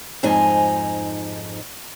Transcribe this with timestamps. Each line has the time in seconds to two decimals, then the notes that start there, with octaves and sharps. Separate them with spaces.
0.23 F2 G#2 D#4 G#5